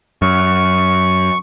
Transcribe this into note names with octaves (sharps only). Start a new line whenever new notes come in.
F#2 C#6